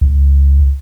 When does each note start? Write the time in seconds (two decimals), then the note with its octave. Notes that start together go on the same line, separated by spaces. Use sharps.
0.01 C#2